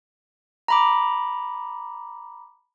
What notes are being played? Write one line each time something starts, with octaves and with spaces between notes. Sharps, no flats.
A#5 B5 D6